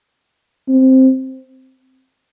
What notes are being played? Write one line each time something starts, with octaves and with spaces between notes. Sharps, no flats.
C4